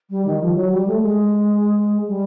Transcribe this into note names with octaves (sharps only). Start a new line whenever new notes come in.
G3
D#3
F3
F#3
G3
A3
G#3
G3